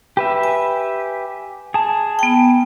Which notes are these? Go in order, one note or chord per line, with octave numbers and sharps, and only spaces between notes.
G4 B4 E5
G#5
G#4 A5
B3 G5